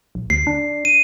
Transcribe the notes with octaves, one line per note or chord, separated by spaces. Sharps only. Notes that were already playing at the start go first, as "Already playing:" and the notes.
A#1
D2 C7
D4
D#7